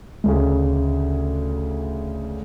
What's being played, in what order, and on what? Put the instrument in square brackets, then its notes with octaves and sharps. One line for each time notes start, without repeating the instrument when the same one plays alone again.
[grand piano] D2 C#3